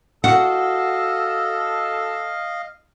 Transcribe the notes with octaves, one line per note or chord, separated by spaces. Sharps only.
F#4 A4 D#5 F5 F#5 E6